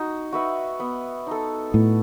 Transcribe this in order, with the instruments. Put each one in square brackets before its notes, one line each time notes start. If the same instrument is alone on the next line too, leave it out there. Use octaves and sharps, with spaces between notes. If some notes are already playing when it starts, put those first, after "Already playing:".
Already playing: [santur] D#4 F#4
F#4 B4 E5
B3
D#4 A4
[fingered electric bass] A2 [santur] B3